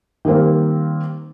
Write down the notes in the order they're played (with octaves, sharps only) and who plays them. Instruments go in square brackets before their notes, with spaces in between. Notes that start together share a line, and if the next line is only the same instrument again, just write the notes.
[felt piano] D#3 G3 A#3 C4